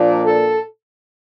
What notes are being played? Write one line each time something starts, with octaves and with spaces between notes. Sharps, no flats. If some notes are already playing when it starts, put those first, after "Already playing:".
Already playing: A#2 F3 A#3 D4 D5
A4